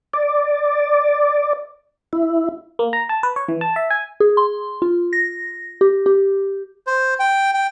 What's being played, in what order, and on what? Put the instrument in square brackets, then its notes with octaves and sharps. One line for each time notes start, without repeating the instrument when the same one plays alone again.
[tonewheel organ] D5
E4
[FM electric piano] A#3
A#5
A5
B4
C#5
E3
A5
E5
G#5
[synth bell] G#4
C6
F4
A#6
G4
G4
[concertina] C5
G5
G5